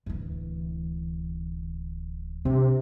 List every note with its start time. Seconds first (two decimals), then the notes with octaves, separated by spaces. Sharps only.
0.06 D1 E3
2.45 C3 D4